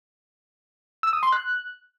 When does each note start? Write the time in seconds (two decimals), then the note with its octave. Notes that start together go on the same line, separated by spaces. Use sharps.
1.03 E6
1.13 D#6
1.23 C6
1.32 F#6